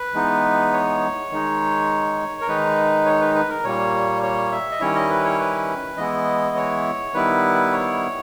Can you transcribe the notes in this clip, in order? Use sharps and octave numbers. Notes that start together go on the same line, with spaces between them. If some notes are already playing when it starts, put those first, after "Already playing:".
Already playing: B4
E3 G#3 B3 D#4
C#5
D#3 G#3 D#4
A#4
D#3 G#3 D#4 B4
C#5
B4
B4
A#4
A#2 G3 A#3 C#5
C#5
E5
D#5
D#3 G3 C#4 E4 C#5
D#5
B4
C#5
B4
E3 G#3 B3 E4 D#5
C#5
D#3 G3 B3 E4 B4
C#5